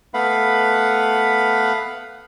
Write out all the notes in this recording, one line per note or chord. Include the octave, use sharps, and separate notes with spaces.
A3 B3 B4 F5 F#5 B5